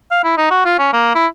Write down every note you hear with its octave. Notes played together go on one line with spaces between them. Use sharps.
F5
E4
D#4
F#4
F4
C#4
A#3
E4